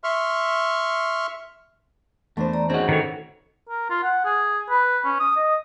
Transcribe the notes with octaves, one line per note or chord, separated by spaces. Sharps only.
E5 C6 C#6 F6
E2 A3 D4 C5
D5 A#5
C4 C#4 D#4 F#4 G#4
D#3 E3 A4 C#5
A#4
F4
F#5
G#4
B4
C#4
D#6
D#5